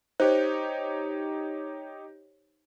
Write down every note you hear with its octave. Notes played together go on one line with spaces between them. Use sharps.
D#4 G4 C5 C#5